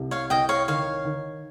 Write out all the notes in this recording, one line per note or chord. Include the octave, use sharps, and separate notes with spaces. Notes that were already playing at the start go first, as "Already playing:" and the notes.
Already playing: C2 C3
C#5 F5
C2 D#5 G5
C#5 F5
D#3 C#5 F5
D#3